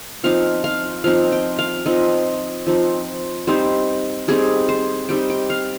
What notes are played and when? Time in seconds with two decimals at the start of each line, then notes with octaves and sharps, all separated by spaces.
0.24 F3 C4 D#4 F5
0.64 F5
1.04 F3 C4 D#4 F5
1.32 G5
1.59 F5
1.86 F3 C4 D#4 D#5
2.67 F3 C4 D#4
3.47 G3 C4 D#4 C5
4.28 G3 C4 D#4 G#4
4.69 C5
5.09 G3 C4 D#4 G5
5.30 G5
5.50 F5